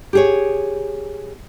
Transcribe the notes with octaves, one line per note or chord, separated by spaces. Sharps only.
G4 G#4 C#5